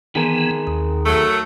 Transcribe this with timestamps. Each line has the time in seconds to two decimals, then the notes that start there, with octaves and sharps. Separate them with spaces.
0.15 D#3 E3 B3 G#4 A#4
0.67 D#2
1.06 F#3 A3